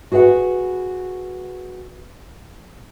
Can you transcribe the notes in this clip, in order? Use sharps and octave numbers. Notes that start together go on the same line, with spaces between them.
F#4 G#4 B4 F5 F#5